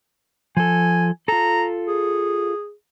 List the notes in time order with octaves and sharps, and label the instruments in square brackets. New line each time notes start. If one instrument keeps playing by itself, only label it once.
[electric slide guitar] F3 A4 [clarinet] G#5
[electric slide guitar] F4 A4 [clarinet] A#5
[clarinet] G#4